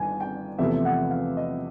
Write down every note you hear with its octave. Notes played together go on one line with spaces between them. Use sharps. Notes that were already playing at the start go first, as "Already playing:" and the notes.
Already playing: G1 D#3 G#5
G5
E2 C3 F3 A3 E5
F#5
F5
D#5